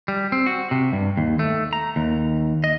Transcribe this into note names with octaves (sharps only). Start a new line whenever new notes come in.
G3
C4
F#4
C3
G2
D#2
A3
A#5
D#2
D#5